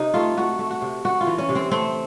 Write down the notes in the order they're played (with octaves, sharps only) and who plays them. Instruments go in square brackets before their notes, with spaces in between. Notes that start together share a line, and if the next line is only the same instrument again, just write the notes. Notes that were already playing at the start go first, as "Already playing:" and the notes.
Already playing: [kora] C3 D#4
A3 F4
A3 F#4
A3
F#4
C3
A3 F#4
F4
E3
C#4
C3
C4
A3 C4